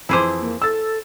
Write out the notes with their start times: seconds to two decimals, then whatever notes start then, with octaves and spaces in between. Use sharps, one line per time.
0.09 F2 E3 E4 G#4 C5 D6
0.40 A#3
0.62 A4 E6 A6